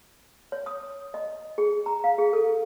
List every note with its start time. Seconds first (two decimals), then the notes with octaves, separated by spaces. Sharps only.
0.52 C#5
0.66 D#6
1.14 D#5
1.58 G#4
1.86 A#5
2.04 F5
2.18 G#4
2.33 A4